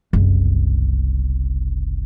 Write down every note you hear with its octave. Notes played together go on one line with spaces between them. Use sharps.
F#1 C2